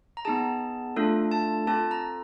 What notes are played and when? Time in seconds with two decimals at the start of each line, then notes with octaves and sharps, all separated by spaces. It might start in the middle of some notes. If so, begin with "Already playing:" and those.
0.17 A#5
0.25 B3 D#4 G#4 A5
0.96 A3 D4 F4 A4
1.31 A5
1.67 C4 F4 A4 A5
1.91 A#5